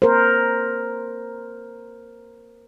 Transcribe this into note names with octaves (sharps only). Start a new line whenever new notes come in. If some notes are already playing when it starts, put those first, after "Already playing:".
A#4 C5